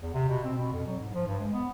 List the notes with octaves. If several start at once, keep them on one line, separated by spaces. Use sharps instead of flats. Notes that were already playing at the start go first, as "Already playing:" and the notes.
E2
C3
B2
C4
B2
F2
F#3
G#2
F3
G2
G#3
B3